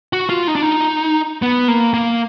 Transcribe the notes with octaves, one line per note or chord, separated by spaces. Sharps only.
F#4
F4
D#4
D4
D#4
B3
A#3
A#3